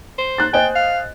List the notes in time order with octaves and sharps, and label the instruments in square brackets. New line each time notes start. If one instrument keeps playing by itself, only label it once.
[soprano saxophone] C5
[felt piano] F#6 A6
[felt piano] C5 D#5 G#5 [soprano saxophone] G5
[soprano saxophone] F5